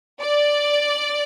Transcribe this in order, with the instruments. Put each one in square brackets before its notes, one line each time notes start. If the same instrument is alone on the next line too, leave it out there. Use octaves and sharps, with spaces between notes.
[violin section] D5